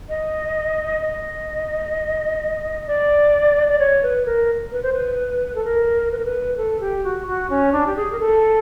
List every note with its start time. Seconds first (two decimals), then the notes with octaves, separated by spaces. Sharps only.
0.09 D#5
1.01 D#5
2.87 D5
3.68 D5
3.79 C#5
4.03 B4
4.26 A#4
4.72 B4
4.83 C5
4.93 B4
5.55 A4
5.65 A#4
6.11 B4
6.19 A#4
6.25 B4
6.57 A4
6.81 G4
7.04 F#4
7.27 F#4
7.50 C#4
7.73 D4
7.87 G4
7.96 G#4
8.12 A#4
8.19 A4